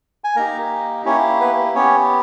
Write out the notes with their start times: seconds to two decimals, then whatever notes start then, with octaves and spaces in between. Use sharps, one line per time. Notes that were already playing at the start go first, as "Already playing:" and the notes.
0.24 G#5
0.36 A#3 D#4 G4 A#4 A#5
1.05 A#3 C#4 E4 G4 C#5
1.40 B3 B4
1.75 B3 C#4 G4 C#5